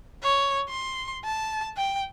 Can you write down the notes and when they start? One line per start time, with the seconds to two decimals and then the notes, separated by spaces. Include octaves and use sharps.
0.23 C#5
0.69 C6
1.25 A5
1.77 G5